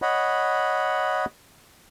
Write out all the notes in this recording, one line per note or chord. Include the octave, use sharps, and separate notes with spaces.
C#5 D#5 F#5 B5